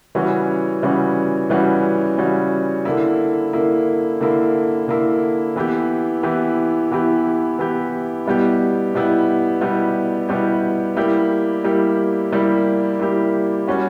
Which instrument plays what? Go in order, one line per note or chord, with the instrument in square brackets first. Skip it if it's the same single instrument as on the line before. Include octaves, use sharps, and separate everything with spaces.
[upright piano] C#3 E3 G3 C#4 F#4
C#3 E3 G3 C#4 F#4
C#3 E3 G3 C#4 F#4
C#3 E3 G3 C#4 F#4
D3 A#3 E4
D3 A#3 E4
D3 A#3 E4
D3 A#3 E4
E3 B3 E4 G4
E3 B3 E4 G4
E3 B3 E4 G4
E3 B3 E4 G4
B2 G3 B3 E4 G4
B2 G3 B3 E4 G4
B2 G3 B3 E4 G4
B2 G3 B3 E4 G4
G3 A#3 E4 G4
G3 A#3 E4 G4
G3 A#3 E4 G4
G3 A#3 E4 G4
G3 C#4 F#4